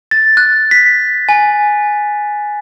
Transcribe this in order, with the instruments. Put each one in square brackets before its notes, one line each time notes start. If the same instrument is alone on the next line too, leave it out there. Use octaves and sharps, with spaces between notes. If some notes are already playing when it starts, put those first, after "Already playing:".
[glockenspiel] A6
F#6
B6
G#5